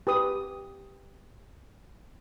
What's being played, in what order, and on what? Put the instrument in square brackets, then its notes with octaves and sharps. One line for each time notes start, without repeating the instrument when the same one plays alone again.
[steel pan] G4 B4 D#6